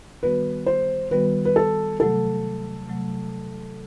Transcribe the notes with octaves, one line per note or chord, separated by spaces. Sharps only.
D#3 G3 B3 F#4 B4
C5
D#3 G3 B3 F#4 B4
B4
A4
C3 F#3 A3 A4
C3 F#3 A3